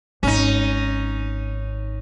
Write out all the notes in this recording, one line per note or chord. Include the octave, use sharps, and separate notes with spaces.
G#1 C#4 D#4